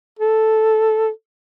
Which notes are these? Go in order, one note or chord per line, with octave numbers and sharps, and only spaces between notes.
A4